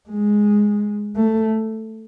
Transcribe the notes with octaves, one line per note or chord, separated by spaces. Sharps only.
G#3
A3